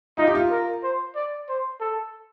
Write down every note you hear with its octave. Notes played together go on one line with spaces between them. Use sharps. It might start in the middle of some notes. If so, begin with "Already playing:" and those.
D#4 F4
G4
F4
A#4
C5
D5
C5
A4